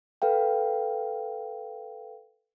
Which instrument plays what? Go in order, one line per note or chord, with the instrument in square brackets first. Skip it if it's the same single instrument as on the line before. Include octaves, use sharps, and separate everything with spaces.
[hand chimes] A4 B4 F5 G5